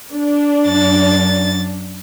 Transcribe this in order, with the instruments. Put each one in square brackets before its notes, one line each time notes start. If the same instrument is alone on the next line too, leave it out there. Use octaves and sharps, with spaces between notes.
[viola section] D4
[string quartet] F#2 A6